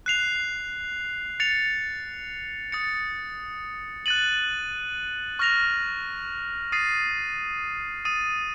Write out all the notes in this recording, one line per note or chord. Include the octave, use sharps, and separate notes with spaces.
F#6 C7 F7
A6 C#7 F7
D#6 A6 C#7
F#6 A6 D#7 F#7
C#6 F6 A#6 F7
D#6 A6 C7 D#7
D#6 A6 D#7